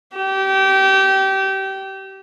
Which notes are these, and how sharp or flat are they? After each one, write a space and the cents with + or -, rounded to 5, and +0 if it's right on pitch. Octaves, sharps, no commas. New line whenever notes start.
G4 -25